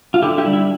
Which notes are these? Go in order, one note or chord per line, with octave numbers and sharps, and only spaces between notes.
F4
D3 E4 G4
E4 G4
G3 D4
E4